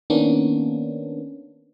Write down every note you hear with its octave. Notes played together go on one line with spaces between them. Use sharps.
D#3 A#3 B3 C#4 D4